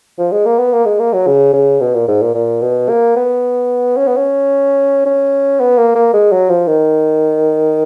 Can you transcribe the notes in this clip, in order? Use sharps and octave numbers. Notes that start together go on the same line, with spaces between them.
F3
G#3
A#3
B3
A#3
G#3
A#3
F#3
C#3
C#3
B2
A#2
G#2
A#2
A#2
B2
A#3
B3
C#4
B3
C#4
C#4
B3
A#3
A#3
G#3
F#3
F3
D#3